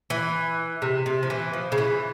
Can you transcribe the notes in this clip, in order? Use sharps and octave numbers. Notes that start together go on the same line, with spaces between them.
E3
C3
C3
F3
E3
F3
C#3
E3